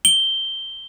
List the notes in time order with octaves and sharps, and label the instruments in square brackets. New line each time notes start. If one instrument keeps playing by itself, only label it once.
[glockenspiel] G7